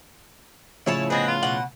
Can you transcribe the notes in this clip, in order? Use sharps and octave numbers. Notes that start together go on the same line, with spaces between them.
A2 C#3 F3 E4 C#5 A5
B3 C4 G#4 B4 D#5
F4
B2 F#5